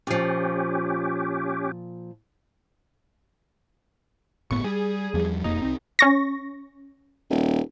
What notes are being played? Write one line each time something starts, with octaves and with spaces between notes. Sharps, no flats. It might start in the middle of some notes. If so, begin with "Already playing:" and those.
A#2 F3 C#4 G4
G1 A2 B3 C#6
G3 G#4
E2 F3 G3
E1 F2 A#3 D#4
C2 C4
C#4 C#6 A#6
D#1